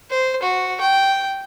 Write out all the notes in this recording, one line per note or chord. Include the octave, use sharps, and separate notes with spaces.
C5
F#4
G5